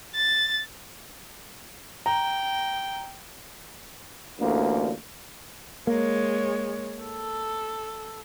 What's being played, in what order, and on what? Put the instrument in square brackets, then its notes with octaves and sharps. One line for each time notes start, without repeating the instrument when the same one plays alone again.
[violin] A6
[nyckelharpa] G5 [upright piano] A#5
[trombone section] A1 D2 D3 A#3
[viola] G#3 C#5 [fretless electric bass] A#3
[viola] A4